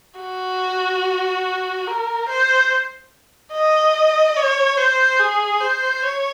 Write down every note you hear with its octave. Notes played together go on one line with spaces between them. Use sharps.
F#4
A#4
C5
D#5
C#5
C5
G#4
C5
C#5